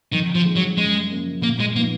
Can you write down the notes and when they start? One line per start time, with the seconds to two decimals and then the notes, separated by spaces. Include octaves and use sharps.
0.12 F2 D#3
0.35 F3
0.45 D#3 G#3
0.56 F#3
0.77 F#2 G#3
1.10 C#3 F3 A#3 C#4
1.43 A#2 A#3
1.60 G#3
1.76 F3 A#3 B3 D#4